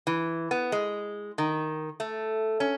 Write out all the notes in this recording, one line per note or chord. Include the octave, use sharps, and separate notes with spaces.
E3
B3
G#3
D#3
A3
C#4